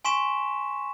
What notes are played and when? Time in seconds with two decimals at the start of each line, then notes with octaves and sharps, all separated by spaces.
0.05 G#5 C6 C#6 B6 E7